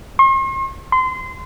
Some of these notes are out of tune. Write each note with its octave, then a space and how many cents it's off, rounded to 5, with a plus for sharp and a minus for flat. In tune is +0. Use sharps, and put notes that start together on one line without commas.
C6 +45
C6 -25